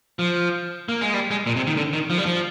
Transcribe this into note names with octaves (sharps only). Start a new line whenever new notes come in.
F3
A#3
G#3
G3
G#3
A#2
C3
D#3
D3
D#3
F3
G3
F3